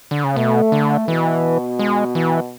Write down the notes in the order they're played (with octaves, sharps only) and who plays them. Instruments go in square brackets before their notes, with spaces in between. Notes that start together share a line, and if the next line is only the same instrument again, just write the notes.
[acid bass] D3
C#3
[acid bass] B2 [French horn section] A3
[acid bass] D3
[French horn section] B2 [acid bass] E3
[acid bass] G#3
E3